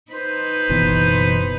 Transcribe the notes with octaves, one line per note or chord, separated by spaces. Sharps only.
D#4 B4 C5
F#1 B2 E3